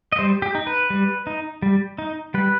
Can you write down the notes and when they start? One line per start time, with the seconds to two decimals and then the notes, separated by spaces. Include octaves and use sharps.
0.12 D#5
0.19 G3 C5
0.42 G4
0.55 D#4
0.67 B4
0.90 G3
1.27 D#4
1.62 G3
1.98 D#4
2.34 G3 B4